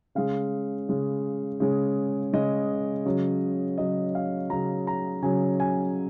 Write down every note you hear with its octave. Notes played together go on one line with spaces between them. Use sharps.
C#3 G#3 F5
C#3 G#3
C#3 G#3
C#3 G#3 D#5
C#3 F#3
C#3 F#3 D#5
F5
C#3 F#3 A#5
A#5
C#3 F#3 G#5
G#5